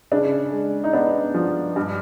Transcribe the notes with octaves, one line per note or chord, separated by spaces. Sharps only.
C#3 D4
G#3
D#4
B3 D4
F3
G2